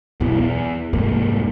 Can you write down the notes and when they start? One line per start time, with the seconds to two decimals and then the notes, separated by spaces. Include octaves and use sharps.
0.20 B1 E2 B2 E3
0.37 E2
0.93 C2 F2 G#2 A#3